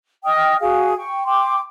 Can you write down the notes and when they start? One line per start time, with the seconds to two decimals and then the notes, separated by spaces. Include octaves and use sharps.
0.25 D#5 G5 D#6 F6
0.60 F#4 G#4 F5
0.96 G5 C#6
1.25 G5 C6 D6